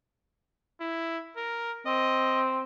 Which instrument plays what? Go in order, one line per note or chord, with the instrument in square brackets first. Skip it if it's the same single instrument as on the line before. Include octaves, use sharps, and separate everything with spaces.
[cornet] E4
A#4
[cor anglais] C4 [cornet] D#5